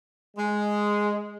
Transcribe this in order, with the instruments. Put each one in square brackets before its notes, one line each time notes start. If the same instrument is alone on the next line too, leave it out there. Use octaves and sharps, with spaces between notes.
[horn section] G#3